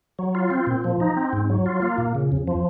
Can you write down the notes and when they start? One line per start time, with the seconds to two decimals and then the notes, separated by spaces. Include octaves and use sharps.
0.19 F#3
0.35 F4
0.51 C4
0.67 A#2
0.84 F3
1.00 D#4
1.17 C4
1.33 G#2
1.50 F#3
1.66 F4
1.82 A#3
1.98 A#2
2.15 C#3
2.32 F2
2.47 F3